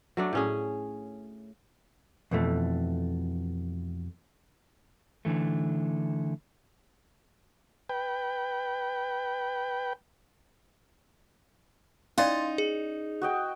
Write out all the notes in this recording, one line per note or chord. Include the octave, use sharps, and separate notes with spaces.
F#3 A3 D4
A2 C#4 G#4
F2 B2 E3 A3
D3 E3 A3
B4 G5
C#4 D#4 D5 F5 C6 A6
G#4
F#4 D#5 G5